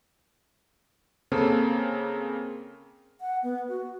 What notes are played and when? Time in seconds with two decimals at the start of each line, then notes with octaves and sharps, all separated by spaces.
1.32 C#3 A#3 C4 A4
3.21 F#5
3.43 B3
3.69 F#4